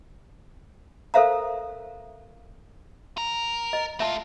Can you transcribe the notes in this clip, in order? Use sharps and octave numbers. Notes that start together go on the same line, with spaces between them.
A4 A#4 C5 E5 F5 A#5
A#4
D#5
A3 F4 E5 A5